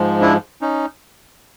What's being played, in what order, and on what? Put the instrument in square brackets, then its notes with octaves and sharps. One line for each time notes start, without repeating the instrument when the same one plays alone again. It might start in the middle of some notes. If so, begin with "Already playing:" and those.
Already playing: [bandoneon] G#2 F3 G#3
D4 E4
C#4 D#4